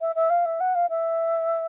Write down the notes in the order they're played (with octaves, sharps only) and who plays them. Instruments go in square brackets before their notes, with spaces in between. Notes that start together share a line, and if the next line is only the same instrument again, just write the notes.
[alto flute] E5
E5
F5
E5
F#5
F5
E5